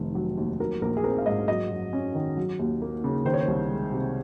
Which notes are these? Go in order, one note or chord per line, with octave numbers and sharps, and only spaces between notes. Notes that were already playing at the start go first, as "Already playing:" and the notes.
Already playing: F1 D#3
F#3
D#2
F#3 A#4
A#1 A#4
G#4
C4 A#4
F5
G#2 D#5
F#3 D#5
F#2
C#4
D#3
F#3
D#2
A#3
C#3
D#3 C5
C#5
C5
C2
G#3
C3